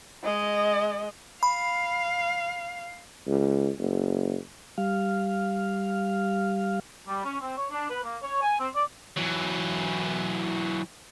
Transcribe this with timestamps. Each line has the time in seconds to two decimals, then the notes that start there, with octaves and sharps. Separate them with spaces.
0.24 G#3 D#5
1.43 F5 B5
3.27 C#2
3.79 F#1
4.78 G3 F5
7.08 G3
7.25 C#4
7.41 C4
7.58 C#5
7.71 D4
7.89 B4
8.04 A#3
8.23 C#5
8.42 G#5
8.59 C4
8.75 D5
9.17 E3 F#3